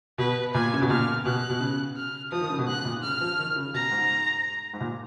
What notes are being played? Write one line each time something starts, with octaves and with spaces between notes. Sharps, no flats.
B2 B4
A#2 G#5
C#3
B2
A#2 F6
B2 F#6
B2
C#3
F6
F3 D#6
D#3
C#3
B2
G#2 F#6
A#2
C#3 F6
F3
D#3
C#3
B2 A#5
G#2
G#2
A#2